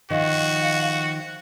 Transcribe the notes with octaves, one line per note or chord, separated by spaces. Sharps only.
D#3 F3 F#4 F5